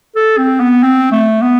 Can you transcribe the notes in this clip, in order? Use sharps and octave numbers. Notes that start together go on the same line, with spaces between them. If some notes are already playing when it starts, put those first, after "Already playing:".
A4
C4
B3
C4
A3
B3